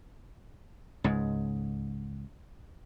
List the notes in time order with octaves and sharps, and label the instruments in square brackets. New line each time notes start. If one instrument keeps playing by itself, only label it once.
[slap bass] C#2 G#2